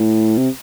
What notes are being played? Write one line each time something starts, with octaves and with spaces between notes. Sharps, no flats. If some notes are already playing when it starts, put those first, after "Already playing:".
Already playing: A2
C3